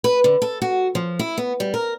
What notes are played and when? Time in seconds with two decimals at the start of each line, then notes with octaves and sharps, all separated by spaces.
0.04 B4
0.24 D3
0.42 A4
0.62 F#4
0.95 F3
1.19 E4
1.38 B3
1.60 G3
1.74 A#4